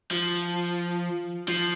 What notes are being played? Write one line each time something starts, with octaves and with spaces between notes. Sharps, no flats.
F3
F3